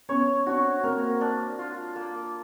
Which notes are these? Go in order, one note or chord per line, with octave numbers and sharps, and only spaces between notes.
B3 C#4 C#5
C4 D4 F#4
A#3 C4 A#4
D4
F4
A#3